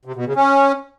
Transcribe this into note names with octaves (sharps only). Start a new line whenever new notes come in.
C3
B2
C#3
C#4